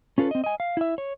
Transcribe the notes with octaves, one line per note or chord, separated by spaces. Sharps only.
C#4 F4 A4 B4
C4 D#5
D#5 G#5
F5
E4 E5
C#5